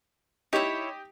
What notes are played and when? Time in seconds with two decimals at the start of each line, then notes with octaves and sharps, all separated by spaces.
0.53 D#4 E4 G4 C#5